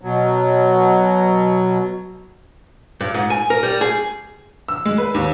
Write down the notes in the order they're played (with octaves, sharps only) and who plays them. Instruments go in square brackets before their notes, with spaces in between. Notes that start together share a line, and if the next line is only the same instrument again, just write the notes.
[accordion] B2 F#3
[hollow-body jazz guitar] G2
G#2
G#5
A#4
G3
G#4
[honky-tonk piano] E6
G#3
B4
D#2